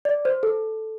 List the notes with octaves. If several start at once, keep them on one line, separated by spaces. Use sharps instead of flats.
D5
C5
A4